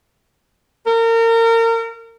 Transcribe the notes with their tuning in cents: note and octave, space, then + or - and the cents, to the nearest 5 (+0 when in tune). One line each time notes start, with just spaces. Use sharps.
A#4 -30